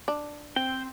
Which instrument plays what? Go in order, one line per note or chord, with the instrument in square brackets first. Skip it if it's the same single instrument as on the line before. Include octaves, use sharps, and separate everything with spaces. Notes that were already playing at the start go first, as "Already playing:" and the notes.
[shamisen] D4
[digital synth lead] C4 [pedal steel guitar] G5